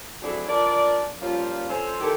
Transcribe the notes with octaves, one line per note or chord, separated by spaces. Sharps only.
F#3 A3 C4 D4 E4 G#4
F3 D4 A#4 D5
F3 G3 A#3 C#4 F4
F2 C#4 A4 C5
D#3 A3 E4 G4 A4 A#4